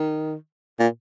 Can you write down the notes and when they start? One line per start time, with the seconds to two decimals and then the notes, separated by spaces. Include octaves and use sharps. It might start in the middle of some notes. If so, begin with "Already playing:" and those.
Already playing: D#3
0.80 A#2